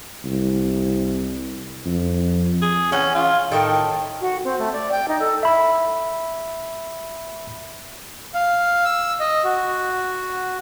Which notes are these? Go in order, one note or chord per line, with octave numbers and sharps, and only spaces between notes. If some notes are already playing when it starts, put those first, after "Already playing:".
C2
F2
G#4
E3 C#4 F#5
F4
A2 D#3 A4 G5
F#4
C4
A3
D5
G5
D#4
A4
E5 B5
F5
E6
D#5
F#4